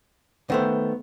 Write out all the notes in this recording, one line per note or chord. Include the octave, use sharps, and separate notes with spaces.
D#3 A3 B3 C5